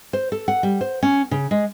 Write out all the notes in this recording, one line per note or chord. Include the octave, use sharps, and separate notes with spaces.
C5
A4
F#5
G3
C5
C#4
C#3
G#3